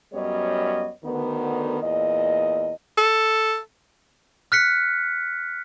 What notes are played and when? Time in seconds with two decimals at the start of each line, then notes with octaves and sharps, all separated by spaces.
0.14 F#2 G3 B3 C#5 D#5
1.03 D2 D3 D#3 B3
1.81 E2 A#2 D#5
2.98 A4
4.52 F6 F#6 B6 C#7